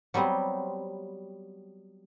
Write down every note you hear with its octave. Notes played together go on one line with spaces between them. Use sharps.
F#3 G3 B3 C4